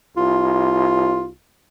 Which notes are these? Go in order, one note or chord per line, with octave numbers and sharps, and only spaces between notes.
C2 F4